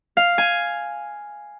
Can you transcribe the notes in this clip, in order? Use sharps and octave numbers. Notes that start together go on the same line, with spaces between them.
F5
G#5